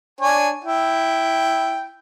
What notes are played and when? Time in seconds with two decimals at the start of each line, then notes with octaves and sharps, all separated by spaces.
0.21 D4 C#5 G#5
0.64 E4 G5